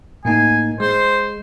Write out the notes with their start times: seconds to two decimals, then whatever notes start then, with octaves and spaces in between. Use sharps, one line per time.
0.25 A2 A#3 D#4 G#5
0.80 G#3 C5